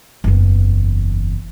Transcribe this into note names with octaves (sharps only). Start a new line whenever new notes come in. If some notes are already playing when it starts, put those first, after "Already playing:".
F#1 E2